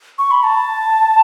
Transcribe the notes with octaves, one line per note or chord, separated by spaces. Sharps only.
C#6
B5
A5